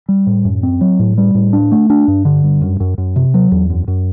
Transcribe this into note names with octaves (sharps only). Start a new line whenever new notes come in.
G3
A2
F#2
C4
F#3
A2
G3
A2
D4
A3
D4
G2
D3
G2
F#2
F#2
F#2
C3
F#3
E2
F#2
F#2